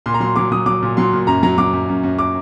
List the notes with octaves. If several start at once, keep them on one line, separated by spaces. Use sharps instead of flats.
A#2 C6
A#5
F#3 C6
F#3 D6
F#3 D#6
F#3 D6
A#2
F#3 C6
A#2
F#2 A#5
F#3 A#5
F#3 D6
F#2
F#2
F#2
D6